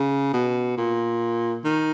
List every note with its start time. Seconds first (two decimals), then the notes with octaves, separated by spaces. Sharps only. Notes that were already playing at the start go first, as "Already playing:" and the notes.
Already playing: C#3
0.33 B2
0.77 A#2
1.65 D#3